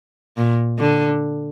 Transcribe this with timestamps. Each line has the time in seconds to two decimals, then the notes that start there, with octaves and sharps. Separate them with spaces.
0.37 A#2
0.79 D3